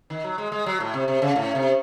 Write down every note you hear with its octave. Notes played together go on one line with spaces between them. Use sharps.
D#3
F#3
G#3
G#3
F#3
A2
C3
C3
C#3
A2
C3